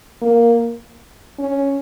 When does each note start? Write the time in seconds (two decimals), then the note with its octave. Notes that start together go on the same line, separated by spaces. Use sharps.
0.22 A#3
1.39 C#4